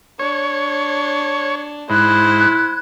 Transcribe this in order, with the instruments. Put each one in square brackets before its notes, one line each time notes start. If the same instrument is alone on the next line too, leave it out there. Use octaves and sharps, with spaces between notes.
[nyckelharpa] D4 [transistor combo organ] C#5
[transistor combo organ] G#2 [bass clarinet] E4 [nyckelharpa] C5 [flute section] F#6 G#6